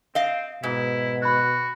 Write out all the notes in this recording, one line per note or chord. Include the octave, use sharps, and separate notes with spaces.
C4 D#5 F5
G#2 B2 E4
F#4 B5 F#6